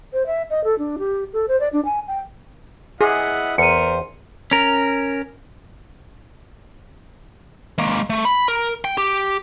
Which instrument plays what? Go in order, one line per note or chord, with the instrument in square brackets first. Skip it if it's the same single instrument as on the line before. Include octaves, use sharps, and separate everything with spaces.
[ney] C5
E5
D#5
A4
D4
G4
A4
C5
D5
D4
G#5
G5
[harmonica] E4 D#5 F#5 [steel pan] G#4
[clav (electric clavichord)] E2 [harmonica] A#4 C5 [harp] C#7 D#7
[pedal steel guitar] C#4 A#4
[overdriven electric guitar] G#3 A#3
A3
B5
A#4
G5
G4